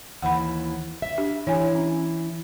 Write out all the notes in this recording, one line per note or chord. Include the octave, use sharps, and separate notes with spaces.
D#2 E3 F#5 B5
E5
D4 G4
E3 E4 C#5 G#5
C#4